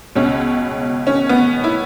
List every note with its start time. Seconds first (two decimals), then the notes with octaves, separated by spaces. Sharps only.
0.15 C#2 B2 C#4
1.07 C#4
1.29 B3
1.64 E4